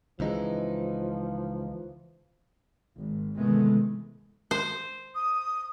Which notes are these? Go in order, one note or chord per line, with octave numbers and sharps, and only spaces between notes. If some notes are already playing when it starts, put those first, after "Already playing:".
C#2 E3 F3 G#3 D#4
G#1
C3 D#3 E3 G#3 A3 B3
C5
D#6